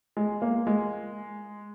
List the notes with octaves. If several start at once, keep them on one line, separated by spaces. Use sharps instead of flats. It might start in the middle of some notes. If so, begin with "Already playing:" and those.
G#3
A#3
G#3